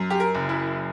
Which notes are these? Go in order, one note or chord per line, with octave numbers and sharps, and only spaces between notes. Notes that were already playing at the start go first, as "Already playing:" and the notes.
Already playing: F#2
G4
A#4
F#1
E4